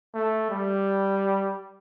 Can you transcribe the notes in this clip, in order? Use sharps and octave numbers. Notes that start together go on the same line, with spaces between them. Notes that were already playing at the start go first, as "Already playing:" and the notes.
A3
G3